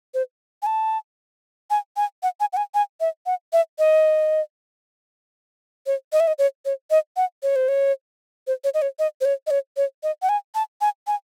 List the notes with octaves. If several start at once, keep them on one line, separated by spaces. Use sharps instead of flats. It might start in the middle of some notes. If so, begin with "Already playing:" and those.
C5
G#5
A5
G#5
G#5
F#5
G#5
F#5
G#5
G#5
E5
F#5
E5
D#5
C#5
D#5
E5
D#5
C#5
C#5
D#5
F#5
C#5
C5
C#5
C5
C#5
D#5
C#5
D#5
C5
C#5
D#5
C#5
C#5
D#5
F#5
G#5
A5
G#5
G#5